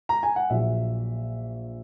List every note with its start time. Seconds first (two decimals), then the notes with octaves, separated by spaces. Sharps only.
0.09 A#5
0.23 G#5
0.36 F#5
0.50 A#1 A#2 F#3 E5